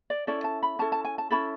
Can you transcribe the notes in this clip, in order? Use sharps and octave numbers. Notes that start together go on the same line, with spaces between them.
D5
C#4 E4 A4 D5
A5
B5
C#4 E4 A4 A5
A5
G#5
A5
C#4 E4 A4 B5